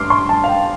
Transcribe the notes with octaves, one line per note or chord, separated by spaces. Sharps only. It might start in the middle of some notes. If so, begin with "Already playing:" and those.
Already playing: G2 C6 D6 F6
C6
A5
F5
G5